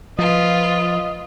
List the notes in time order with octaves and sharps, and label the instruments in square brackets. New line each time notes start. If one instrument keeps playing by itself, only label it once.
[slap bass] F3 [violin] F4 B4 [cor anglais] D#5